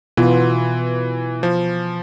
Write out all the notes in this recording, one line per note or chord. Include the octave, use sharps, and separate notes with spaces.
B2 E3 B3 F4
F3